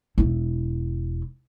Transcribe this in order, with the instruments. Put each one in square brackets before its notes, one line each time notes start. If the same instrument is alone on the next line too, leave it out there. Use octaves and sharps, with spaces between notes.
[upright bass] E1 E4